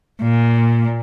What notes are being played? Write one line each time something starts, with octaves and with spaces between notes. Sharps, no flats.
A#2